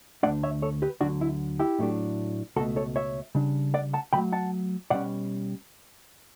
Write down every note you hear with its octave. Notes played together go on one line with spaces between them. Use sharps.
D2 D3 A3 D4 D5 F#5
C#5 E5
A4 C#5
G4 B4
D2 D3 F#3 D4 F#4
E4
E4 G4
A2 F#3 A3 D4
C#2 B2 A3 F#4 A4
A4 C#5
C#5 E5
C#3 G3 D4
D5 F#5
F#5 A5
C#3 F#3 A3 G5 B5
F#5 A5
B2 G3 C#4 D5 F#5